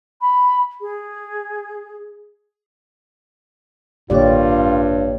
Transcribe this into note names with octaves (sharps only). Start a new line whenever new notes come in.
B5
G#4
A1 G2 D3 A#3 F4 G4 C#5 D5